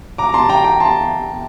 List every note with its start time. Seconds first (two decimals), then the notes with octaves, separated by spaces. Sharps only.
0.18 A#5 D6
0.29 A#5
0.34 A5 C6
0.49 G5 A#5
0.64 G5 A#5
0.80 A5 C6